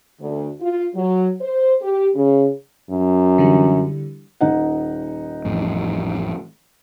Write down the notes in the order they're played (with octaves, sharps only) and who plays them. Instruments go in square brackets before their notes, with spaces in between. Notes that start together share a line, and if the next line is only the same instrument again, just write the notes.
[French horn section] D2
F4
F#3
C5
G4
C#3
[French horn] F#2
[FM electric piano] D3 E3 G3
[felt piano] D#1 D#4 F#5
[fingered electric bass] A1 F2 A2